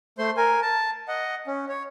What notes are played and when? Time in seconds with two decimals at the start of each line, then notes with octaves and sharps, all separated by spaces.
0.18 A3 C5 C6
0.37 A#4 G#5
0.62 A5
1.08 D#5 F#5
1.47 C#4
1.69 C#5